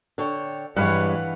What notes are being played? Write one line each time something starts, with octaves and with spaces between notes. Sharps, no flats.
D3 C#5 G5
G2 E3 G3 G#3 B4 C#5 F5 F#5